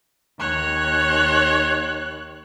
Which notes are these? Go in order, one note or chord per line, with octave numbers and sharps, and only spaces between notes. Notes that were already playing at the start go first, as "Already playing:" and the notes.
D#2 C#5 F#6